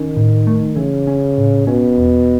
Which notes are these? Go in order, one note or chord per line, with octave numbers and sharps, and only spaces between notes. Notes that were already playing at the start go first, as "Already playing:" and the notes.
Already playing: D#3 C#4
A2
A3
C#3 E3
C#4
A2
B2 C#4
E2